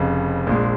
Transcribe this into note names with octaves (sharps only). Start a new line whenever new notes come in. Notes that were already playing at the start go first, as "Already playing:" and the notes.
Already playing: F1 F2 C#3
A#1 A#2 G#3